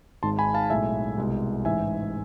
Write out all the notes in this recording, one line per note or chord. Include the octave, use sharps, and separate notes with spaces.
G#1 G#2 G#3 A5 C6
G#5 B5
F5 A5
B1 A2 G#3 E5 G#5
C2 B2 G#3
A1 G#2 E3 G#3 E5 G#5